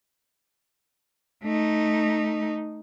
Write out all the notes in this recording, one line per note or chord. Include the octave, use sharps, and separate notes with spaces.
A3 D#4